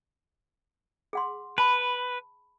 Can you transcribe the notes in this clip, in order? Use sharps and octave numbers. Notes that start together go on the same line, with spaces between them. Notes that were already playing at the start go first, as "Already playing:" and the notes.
G#4 F#5 C6
B4 A5 B5